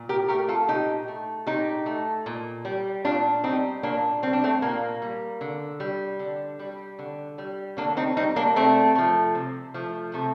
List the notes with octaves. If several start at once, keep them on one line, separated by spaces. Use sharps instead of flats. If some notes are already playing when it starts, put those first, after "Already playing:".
Already playing: A#2
G4 A#4
A3 G4 A#4
F4 A4
A#2 D#4 G4
A3
A#2 D#4 G4
A3
A#2
G3
A#2 D4 F4
G3 C4 D#4
A#2 A#3 D4
G3 C4
D4
A3 C4
A#2 A#3
G3
D3
G3
D3
G3
D3
G3
D3 A#3 D4
C4 D#4
G3 C4 D#4
A#3 D4
C3 A3 C4
F3 A3
C3
F3 A3
C3 A3